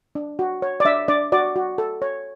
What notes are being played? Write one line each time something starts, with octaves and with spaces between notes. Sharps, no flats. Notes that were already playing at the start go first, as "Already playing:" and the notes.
D4
F#4
C#5
D5
D4 E5
D4 D5
F#4 D5
F#4
A4
C#5